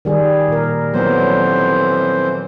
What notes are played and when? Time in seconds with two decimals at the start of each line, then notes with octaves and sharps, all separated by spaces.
0.05 D#3 G3 G#4
0.48 A#2 A#4
0.94 F2 E3 F#3 B3 C5